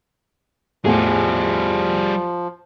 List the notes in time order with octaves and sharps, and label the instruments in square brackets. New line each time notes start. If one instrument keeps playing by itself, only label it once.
[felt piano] E2 A2 [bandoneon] F3 [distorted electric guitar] G3 G#4